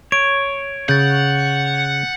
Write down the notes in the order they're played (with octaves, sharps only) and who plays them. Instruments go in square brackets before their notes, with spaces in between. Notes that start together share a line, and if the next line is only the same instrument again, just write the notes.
[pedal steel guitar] C#5 [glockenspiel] D7
[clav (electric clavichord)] C#3 [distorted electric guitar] F#5 [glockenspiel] G6 A6